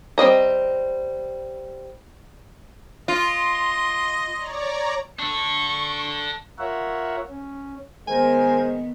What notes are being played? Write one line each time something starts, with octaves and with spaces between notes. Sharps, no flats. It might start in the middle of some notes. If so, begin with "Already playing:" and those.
G3 C4 D#5 A#5
F4 D#5 C6
C#5 D5 A#5
D4 A4 C#6
F4 A#4 C#5 E5 F#5
C#4
D#3 G#3 B3 A#4 C5 G#5